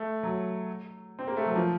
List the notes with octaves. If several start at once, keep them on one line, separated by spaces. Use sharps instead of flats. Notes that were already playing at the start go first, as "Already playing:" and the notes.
Already playing: A3
F#3
C4
A#3
A3
F#3
F3